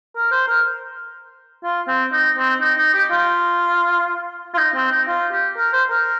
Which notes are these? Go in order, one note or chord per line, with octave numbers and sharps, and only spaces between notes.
A#4
C5
A#4
F4
C4
D#4
C4
D#4
D#4
G4
F4
F4
D#4
C4
D#4
F4
G4
A#4
C5
A#4